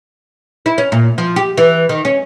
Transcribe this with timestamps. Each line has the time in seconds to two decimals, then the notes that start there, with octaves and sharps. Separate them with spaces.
0.66 E4
0.78 C#4
0.92 A#2
1.18 F3
1.36 G4
1.58 E3
1.89 D#3
2.05 C#4